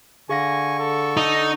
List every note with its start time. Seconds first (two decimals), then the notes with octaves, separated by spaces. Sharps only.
0.29 D3 G#4 F5 G#5 C#6 A#6
0.79 A4
1.17 D#4